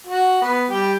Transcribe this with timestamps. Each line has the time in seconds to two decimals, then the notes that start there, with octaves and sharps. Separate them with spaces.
0.07 F#4
0.42 B3
0.70 G3 G4